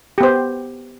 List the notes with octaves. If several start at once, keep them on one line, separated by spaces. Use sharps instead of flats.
B3 G4 C5